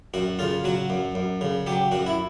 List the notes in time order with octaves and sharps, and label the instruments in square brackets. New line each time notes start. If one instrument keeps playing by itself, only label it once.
[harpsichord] F#2 F#4
C#3 F4
F#3 F#4
F#2
F#2
C#3
F#3 G4
F#2 F#4
E4